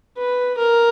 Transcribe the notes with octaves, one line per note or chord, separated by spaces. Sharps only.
B4
A#4